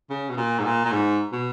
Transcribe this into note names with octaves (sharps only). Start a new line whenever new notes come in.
C#3
B2
A#2
G#2
A#2
A#2
G#2
B2